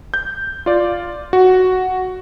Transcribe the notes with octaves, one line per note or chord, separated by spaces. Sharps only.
G6
F4 D5
F#4